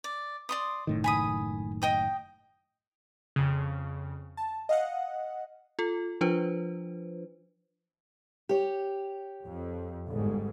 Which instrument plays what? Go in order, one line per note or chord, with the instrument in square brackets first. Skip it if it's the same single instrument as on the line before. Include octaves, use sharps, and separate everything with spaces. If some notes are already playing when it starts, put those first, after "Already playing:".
[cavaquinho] D5
D5 C6 D#6
[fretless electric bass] F#1 A2 D#3
[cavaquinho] G#5 B5 D#6
D#5 G5 D#6
[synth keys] F2 C#3
A5
D#5 F5 F#5
[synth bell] F4 A4
F3 D4 F4 B4 C5
[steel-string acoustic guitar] G4 C#5
[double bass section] F2
G1 G#2